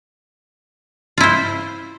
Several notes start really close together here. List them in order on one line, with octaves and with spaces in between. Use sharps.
F4 E4 C5